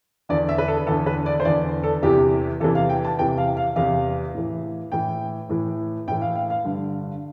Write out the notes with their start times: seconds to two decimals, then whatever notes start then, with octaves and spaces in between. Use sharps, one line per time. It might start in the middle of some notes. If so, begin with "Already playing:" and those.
0.29 E2 D3 D5
0.49 E5
0.58 B4
0.68 A4
0.87 E2 D3 A4
1.06 B4
1.26 D5
1.40 C5
1.45 E2 D3 D5
1.84 A4
2.03 E2 C3 E3 G4
2.60 E2 C3 E3 A4
2.75 F5
2.89 G5
3.05 A5
3.18 E2 C3 E3 G5
3.38 F5
3.57 F5
3.76 E2 C3 E3 F5
4.34 A2 E3
4.92 A2 E3 G5
5.49 A2 E3
6.07 A2 G5
6.12 E3
6.21 F5
6.35 F5
6.50 F5
6.65 G2 D3